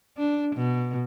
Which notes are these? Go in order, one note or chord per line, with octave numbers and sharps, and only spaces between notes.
D4
B2